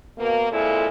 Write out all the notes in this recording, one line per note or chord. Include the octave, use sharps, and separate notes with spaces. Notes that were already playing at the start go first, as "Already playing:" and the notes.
B2 A#3
F2 A#2 G#3 E4 A4